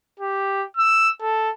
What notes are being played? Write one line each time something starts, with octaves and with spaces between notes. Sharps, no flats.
G4
E6
A4